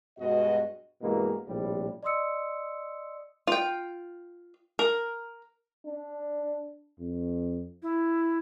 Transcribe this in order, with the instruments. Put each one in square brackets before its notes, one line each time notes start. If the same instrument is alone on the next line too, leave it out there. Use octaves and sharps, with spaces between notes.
[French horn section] G2 B2 G#3 F#4 D#5
[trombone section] G2 B2 E3 G#3 A#3
A#1 A2 C3 G3
[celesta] D5 D#5 C6 D#6 E6 C#7
[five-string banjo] F4 G5
A#4
[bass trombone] D4
F2
[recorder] E4